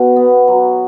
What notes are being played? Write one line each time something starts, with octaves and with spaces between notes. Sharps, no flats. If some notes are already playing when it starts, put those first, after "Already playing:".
Already playing: B2
B3
F#3